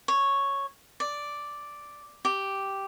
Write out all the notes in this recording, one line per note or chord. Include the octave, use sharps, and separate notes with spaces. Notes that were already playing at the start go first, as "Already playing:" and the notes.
C#5
D5
G4